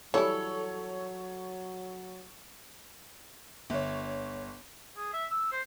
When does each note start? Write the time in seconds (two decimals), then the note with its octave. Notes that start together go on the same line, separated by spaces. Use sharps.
0.14 E3 F#3 G3 E4 A4 C#5
3.70 G1 C#5
4.97 G#4
5.13 E5
5.31 E6
5.52 C5